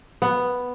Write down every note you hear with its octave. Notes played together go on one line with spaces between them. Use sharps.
B3